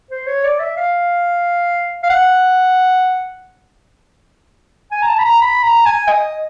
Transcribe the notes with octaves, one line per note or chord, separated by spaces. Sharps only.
C5
C#5
D5
E5
F5
F5
F#5
G#5
A#5
A5
B5
A#5
B5
A#5
G#5
D#5